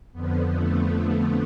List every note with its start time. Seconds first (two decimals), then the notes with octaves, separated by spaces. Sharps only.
0.12 F2 D3 F3 B3
0.50 A3
0.88 B3